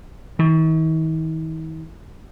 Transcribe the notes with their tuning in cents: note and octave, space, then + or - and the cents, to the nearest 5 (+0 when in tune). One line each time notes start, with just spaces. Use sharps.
D#3 +45